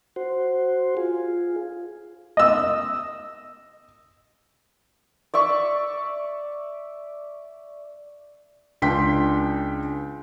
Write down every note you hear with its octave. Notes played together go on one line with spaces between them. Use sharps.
F#4 C5
F4 G#4
D#5 E6
D5 E5 C#6
C#2 D4 G5 C6 B6